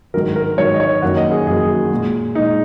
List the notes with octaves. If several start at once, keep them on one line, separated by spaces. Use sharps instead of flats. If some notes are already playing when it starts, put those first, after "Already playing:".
G#2 D#3 F#3 A#4
A#4
G#2 D#3 F#3 C#5
D#5
C#5
F#2 D#3 F#3 A#3 F#5
D#5
G#4
F#2 D#3 F#3 A#3 G#4
F#4
A#2 G#3
A#2 G#3 D#4